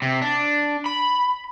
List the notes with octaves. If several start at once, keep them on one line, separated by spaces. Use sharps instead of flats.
C3
D4
B5